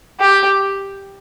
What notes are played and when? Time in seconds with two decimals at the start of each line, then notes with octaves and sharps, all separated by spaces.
0.20 G4